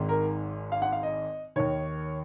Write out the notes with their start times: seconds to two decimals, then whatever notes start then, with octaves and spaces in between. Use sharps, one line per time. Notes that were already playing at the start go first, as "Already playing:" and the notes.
Already playing: G#1 G#2 D#3
0.09 A#4
0.72 F5
0.82 F#5
0.92 F5
1.03 D#5
1.56 D#2 D#3 C#5